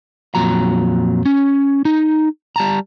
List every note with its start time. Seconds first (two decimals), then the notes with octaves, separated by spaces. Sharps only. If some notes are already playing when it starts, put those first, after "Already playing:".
0.35 F2 A#2 F#3 A#5
1.25 C#4
1.85 D#4
2.56 G3 A5 A#5